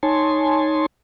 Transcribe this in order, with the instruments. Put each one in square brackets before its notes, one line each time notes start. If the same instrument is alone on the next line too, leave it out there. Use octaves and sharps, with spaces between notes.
[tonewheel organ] D#4 C#5 G#5 A5 C6